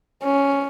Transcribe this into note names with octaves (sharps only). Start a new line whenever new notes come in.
C#4